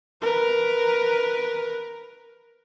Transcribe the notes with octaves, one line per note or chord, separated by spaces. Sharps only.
A#4 B4